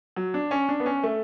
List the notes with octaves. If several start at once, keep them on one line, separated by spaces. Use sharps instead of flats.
F#3
D4
C#4
D4
B3
C#4
A3